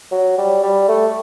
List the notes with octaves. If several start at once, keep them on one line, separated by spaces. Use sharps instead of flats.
F#3
G3
G3
A3